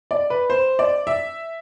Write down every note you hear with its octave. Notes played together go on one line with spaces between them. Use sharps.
D5
B4
C5
D5
E5